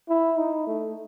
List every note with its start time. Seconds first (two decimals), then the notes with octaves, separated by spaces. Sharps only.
0.09 E4
0.38 D#4
0.67 A3